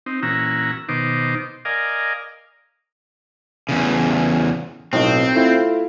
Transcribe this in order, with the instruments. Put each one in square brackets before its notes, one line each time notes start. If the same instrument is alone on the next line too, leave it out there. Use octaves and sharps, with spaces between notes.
[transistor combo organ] C4 D#4
A#2 E3 C#4 F#4 A#5 E6
B2 D#3 D#4 C5 D6
A#4 D5 D#5 F5 G#5
[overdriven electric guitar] E2 C#3
[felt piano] B1 A2 D#4 [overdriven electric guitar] C4
[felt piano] A3 E4 F4